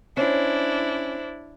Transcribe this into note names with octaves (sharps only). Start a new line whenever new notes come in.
C#4 D4 E4 C5